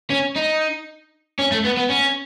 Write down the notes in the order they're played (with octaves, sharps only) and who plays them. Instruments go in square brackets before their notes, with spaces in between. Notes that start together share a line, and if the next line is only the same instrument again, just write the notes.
[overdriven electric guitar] C#4
D#4
C#4
A3
B3
B3
C#4